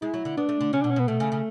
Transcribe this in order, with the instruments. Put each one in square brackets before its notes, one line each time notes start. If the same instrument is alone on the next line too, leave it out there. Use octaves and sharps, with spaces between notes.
[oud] G#3 [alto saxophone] E4
[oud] F#3
D3
[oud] B3 [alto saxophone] D4
[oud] A3
D3
[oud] C#3 [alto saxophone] C#4
[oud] B2 [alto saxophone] D4
[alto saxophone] C#4
[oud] B2
[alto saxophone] B3
[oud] B2 [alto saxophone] A3
[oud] C#3
C#3